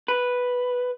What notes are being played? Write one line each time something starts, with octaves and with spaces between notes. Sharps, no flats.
B4